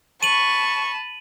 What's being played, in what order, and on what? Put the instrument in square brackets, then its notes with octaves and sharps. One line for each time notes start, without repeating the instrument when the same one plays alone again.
[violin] A5 B5 [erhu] C#6 [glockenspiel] D#7 F#7